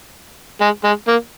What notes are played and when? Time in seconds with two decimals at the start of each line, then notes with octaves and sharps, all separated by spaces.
0.61 G#3
0.84 G#3
1.08 A#3